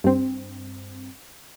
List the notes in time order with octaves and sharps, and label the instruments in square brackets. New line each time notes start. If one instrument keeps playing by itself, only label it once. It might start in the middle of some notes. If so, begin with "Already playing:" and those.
[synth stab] G2 C4